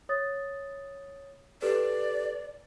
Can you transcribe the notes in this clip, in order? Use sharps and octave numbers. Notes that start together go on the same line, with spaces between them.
C#5 D#6 A6
G4 A4 B4 D5